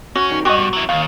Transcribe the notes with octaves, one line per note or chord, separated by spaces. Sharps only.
C#4 F#4
B1 D#3
G2 F#4 G4 D#5
B2
F#3 E4
D#2 F5